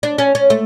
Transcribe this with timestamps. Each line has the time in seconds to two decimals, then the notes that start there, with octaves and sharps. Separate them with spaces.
0.03 D4
0.18 C#4
0.35 C#4
0.50 A3